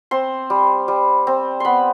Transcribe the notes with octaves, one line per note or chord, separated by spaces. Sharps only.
C4 C6
G3
G3
C4
B3 B5 C6